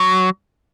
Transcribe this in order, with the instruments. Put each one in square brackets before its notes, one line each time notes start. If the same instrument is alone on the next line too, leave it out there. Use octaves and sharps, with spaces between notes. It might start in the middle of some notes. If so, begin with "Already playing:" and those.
Already playing: [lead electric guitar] F#3